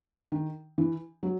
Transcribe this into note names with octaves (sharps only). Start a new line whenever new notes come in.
D#3
E3
F#3